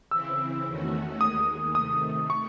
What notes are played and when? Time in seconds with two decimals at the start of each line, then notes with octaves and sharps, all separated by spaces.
0.11 C#3 E3 C4 E4 E6
0.66 E2 D#3 A3 C#4 F#4
1.20 D#2 D#3 G#3 D#6
1.75 C3 D#3 A3 D#6
2.30 C#6